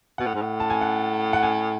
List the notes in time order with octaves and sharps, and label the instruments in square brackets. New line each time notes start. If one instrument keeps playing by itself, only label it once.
[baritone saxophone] B2 [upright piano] F#5
[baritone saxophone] A2
G#2
A2
[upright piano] A5
G#5
F#5
F#5
G#5